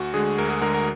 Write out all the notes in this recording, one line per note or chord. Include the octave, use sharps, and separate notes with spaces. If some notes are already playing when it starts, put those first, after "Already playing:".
Already playing: D2 F#4
D3 G#3 G#4
D2 A#4
G#4
D3 G#3 A#4
A#4